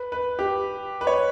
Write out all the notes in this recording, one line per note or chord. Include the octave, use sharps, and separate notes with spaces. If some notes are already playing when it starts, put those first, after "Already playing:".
Already playing: B4
B4
G4
B4
C#5